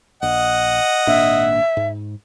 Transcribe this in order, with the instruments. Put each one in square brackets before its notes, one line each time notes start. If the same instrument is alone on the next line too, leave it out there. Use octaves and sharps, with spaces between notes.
[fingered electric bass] A#1 [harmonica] D#5 F#5
[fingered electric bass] G#1 A#2 D4 [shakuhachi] E5
[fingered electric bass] G#2